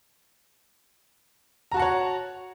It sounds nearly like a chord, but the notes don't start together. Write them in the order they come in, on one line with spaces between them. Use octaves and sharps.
A#5 F#4 A5 F#5 C#5